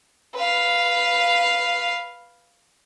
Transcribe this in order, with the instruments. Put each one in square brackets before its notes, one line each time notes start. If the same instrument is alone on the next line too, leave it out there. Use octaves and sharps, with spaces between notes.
[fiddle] B4 F5